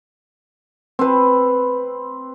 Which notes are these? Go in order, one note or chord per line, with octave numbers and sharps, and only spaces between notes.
C4 B4